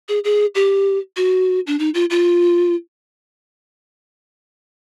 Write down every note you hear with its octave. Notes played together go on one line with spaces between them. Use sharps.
G#4
G#4
G4
F#4
D4
D#4
F4
F4